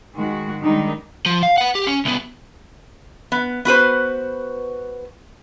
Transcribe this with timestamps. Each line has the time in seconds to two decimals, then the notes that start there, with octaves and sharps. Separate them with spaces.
0.16 D#3 G#3 F#4
0.63 D#3 G3 G#3 D4 D#4
1.26 F3
1.43 F5
1.58 B4 F#5
1.75 G4
1.87 C#4
2.05 C2 B3
3.32 B3
3.65 B3 F#4 B4 C5